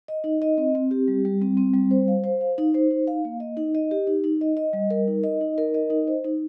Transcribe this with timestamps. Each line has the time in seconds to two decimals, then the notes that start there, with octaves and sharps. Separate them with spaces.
0.08 D#5
0.24 D#4
0.42 D#5
0.58 C4
0.75 C4
0.91 G4
1.08 G3
1.25 G3
1.42 C4
1.57 C4
1.74 G3
1.91 C5
2.08 F5
2.24 C5
2.41 F5
2.58 D#4
2.74 C5
2.91 D#4
3.07 F5
3.25 A#3
3.40 D#5
3.57 D#4
3.75 D#5
3.91 G4
4.07 D#4
4.24 D#4
4.41 D#5
4.57 D#5
4.73 G3
4.90 A#4
5.08 D#4
5.23 D#5
5.41 D#4
5.58 A#4
5.74 D#5
5.90 D#4
6.07 C5
6.24 D#4